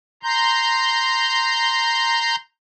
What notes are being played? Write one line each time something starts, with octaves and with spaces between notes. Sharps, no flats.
A#5 C6 G6